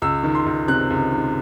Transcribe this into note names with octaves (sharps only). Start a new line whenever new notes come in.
C#2 E6
D#3
C6
C#2
C3 F#6
C#2
D#3